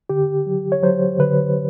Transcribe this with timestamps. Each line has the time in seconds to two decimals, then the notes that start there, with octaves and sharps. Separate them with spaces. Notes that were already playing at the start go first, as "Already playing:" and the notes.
0.10 D3 G4
0.46 F#3
0.72 C#5
0.83 F#3 C5
1.19 D3 B4